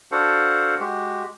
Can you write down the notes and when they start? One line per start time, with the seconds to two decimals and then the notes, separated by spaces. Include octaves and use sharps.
0.12 D4 F#4 A4 C5 F5 F#5
0.80 G#3 F#4 G4